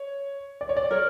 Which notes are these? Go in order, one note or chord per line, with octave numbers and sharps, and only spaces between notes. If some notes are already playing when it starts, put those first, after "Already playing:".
Already playing: C#5
D5
C#5
D5
A#4 C#5